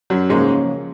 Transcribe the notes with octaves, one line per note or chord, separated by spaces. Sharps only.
F#2 F#3
G#2 C#3 F3 G#3 A#3 C#4